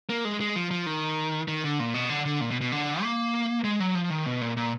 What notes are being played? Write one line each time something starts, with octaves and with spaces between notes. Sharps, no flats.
A#3
G#3
G#3
F3
F3
D#3
D#3
D3
A#2
B2
D3
D3
A#2
B2
B2
D3
A#3
G#3
F#3
F3
D#3
B2
A#2
A#2